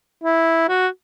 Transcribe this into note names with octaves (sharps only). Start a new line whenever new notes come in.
E4
F#4